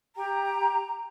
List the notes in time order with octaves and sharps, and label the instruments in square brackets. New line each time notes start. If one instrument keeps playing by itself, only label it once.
[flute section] G4 G5 [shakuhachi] A#5